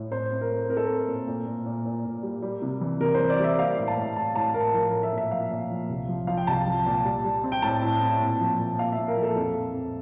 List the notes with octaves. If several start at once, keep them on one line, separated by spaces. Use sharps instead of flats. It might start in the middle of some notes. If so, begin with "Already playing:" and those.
Already playing: A2
C4 C5
C4
A#4
A3
C4 A#4
A4
C4 A#4
A#2
A#2
A#2
A#2
A#2
A#2
G3
G3
C3
E3
C3 A#4
E3 C5
D5
G3 E5
A#3 F5
A2
A5
A2
A2 A5
A2 A5
A2 A#4
F3 A#4
A3 A#4
E5
A#2
E5
F3 F5
A#2
F3
C2
F3
F3 F5
G5
C2 A5
F3
A#2
G3
G3
C4
G5
A2 A5
E4
C4
A#2
F3
A#2
A#2 F5
E5
A#2
A#4
F3
A4
F2 A4
F2
F2